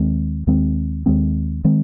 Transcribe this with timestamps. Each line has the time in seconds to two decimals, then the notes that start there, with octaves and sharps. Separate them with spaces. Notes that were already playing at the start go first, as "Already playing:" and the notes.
Already playing: D#2 D#3 G#3 C4
0.47 D#2 D#3 G#3 C4
1.06 D#2 D#3 G#3 C4
1.64 D#3 G#3 C4